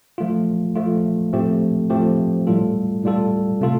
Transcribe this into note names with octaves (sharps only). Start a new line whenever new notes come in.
F3 A3 F4
F3 A3 F4
A2 F3 A3 C4 G4
A2 F3 A3 C4 G4
A2 G3 F4 A4
A2 G3 F4 A4
C3 A3 F4 A4